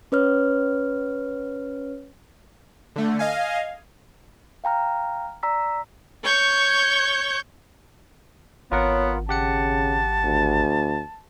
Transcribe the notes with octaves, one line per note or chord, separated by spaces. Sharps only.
C#4 B4 C#5 F6
D3 A3
D#5 F5 G#5
F5 G5 A#5 F6
D5 A#5 E6 B6
C#5 C#6 G6
G#1 B3 F4 A#4 C#5 F#5
C#3 G4 F#5 A5 C#7
D2